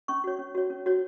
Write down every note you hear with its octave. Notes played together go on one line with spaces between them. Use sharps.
C#4 C#6
F#4 C#5
C#4
F#4 C#5
C#4
F#4 C#5